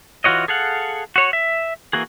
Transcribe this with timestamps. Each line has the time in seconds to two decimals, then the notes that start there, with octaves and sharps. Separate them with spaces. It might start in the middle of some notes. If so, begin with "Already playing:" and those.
0.24 E3 F4 F#4 C#5 D#5
0.48 G#4 A4 F5 F#5
1.16 F#4 C#5
1.33 E5
1.93 E3 A#3 F#4 G#4